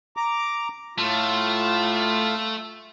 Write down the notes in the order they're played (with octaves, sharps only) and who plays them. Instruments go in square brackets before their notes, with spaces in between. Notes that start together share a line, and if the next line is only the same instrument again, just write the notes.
[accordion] A#5 D6
[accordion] A2 F4 [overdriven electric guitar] A3